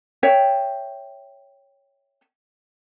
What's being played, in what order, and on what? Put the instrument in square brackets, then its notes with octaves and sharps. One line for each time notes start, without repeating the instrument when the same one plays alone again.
[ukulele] C#5 E5 G5